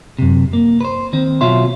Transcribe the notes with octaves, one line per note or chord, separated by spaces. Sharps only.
F#2 C3
A#3
B4 C5
D#3 C4
B1 B2 F4 C#5 E5 C6